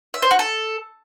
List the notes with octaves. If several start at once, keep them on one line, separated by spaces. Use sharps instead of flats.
E5
C5
F#4
A4